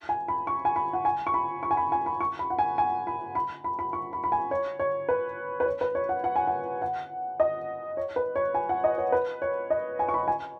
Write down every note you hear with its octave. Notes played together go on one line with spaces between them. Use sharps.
G#5
B5
C#6
G#5
B5
F#5
G#5
C#6
B5
C#6
G#5
B5
G#5
B5
C#6
B5
F#5
G#5
G#5
B5
B5
B5
B5
C#6
B5
B5
G#5
C#5
C#5
B4
B4
C#5
B4
C#5
F#5
F#5
G#5
F#5
F#5
D#5
C#5
B4
C#5
G#5
F#5
D#5
C#5
B4
C#5
D#5
G#5
C#6
B5
G#5